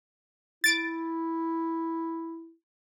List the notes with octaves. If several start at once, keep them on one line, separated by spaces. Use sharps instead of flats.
E4 A6 D7